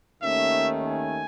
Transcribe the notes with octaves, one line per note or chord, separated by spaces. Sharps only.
D#2 D#3 A3 C#4 E5
G#5